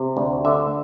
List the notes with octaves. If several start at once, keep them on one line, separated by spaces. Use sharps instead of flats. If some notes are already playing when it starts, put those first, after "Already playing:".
Already playing: C3
D2
D3 E5